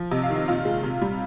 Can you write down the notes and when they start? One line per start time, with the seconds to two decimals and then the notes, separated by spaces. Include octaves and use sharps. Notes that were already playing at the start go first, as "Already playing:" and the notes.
Already playing: F3
0.11 C3 D#5
0.23 F5
0.30 D#3
0.36 D#5
0.48 A#2 F4
0.65 G#3
0.83 C3
1.02 G3